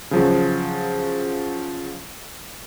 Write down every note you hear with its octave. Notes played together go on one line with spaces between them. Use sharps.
C#3 F3 F#3